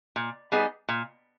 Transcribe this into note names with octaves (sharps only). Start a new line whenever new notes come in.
A#2
G3 B3 D#4 G#4
A#2